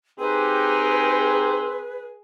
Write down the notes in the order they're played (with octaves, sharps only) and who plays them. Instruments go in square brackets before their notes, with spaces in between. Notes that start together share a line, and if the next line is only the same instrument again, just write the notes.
[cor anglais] C4 [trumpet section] D#4 G4 [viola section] G#4 [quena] B4